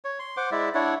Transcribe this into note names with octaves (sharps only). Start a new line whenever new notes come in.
C#5
C6
C5 F#5 D6
G#3 E4 D5 E5
D4 E4 C#5 F#5